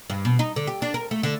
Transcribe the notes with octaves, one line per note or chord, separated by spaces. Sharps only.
G2
B2
D#4
D3
G4
D4
A#4
A3
D3